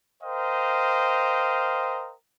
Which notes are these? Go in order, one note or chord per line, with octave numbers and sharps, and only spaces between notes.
A#4 C5 D#5 F5 G5